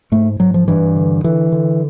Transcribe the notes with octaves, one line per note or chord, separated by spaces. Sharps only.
G#2 A3
G#2 F#3
F3
G2 E3
D3
D3 E3
D3